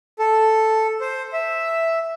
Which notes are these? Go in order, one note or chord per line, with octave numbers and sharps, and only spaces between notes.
A4
C5
E5